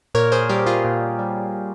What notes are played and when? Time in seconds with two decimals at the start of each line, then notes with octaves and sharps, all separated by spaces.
0.14 A#2 A#4 C#5
0.32 G#4 C5
0.49 G3 G4 A#4
0.66 F4 G#4
0.84 A#2
1.19 G3